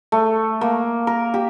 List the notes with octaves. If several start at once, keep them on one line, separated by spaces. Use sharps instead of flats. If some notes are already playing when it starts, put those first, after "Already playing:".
A3
A#3
A#4
G4